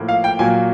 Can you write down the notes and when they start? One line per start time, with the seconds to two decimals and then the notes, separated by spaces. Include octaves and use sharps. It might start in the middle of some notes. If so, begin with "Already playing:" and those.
Already playing: A2 F3 A#3
0.09 F5
0.24 G5
0.39 A#2 F#3 A#3 G#5